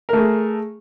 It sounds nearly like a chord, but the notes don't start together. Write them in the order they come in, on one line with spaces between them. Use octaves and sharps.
A#4 A3 G#4